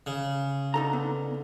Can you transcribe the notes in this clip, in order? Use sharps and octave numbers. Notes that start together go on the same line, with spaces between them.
C#3
D3 D#4 A4 A#5
B3